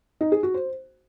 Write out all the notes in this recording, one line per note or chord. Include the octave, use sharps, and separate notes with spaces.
D#4
G#4
F#4
C5